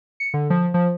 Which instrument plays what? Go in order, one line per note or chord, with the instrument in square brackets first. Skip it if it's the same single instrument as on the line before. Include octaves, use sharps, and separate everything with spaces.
[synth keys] C#7
D3
F3
F3